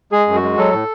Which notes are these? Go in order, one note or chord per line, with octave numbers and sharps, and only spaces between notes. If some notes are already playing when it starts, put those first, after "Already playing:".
G#3 G#4
F#2
F#4
G#3
F#3 A4
A2